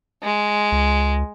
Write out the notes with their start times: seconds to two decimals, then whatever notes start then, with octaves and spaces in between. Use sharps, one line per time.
0.23 G#3
0.72 C#2